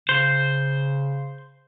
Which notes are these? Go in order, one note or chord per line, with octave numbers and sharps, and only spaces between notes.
C#3 C5